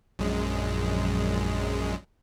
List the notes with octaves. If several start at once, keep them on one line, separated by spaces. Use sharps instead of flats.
A#1 F#2 G#3